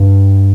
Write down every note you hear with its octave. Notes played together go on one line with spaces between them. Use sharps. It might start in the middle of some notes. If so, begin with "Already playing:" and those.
Already playing: G2